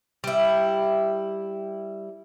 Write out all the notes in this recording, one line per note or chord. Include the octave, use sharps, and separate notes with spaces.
G3 E4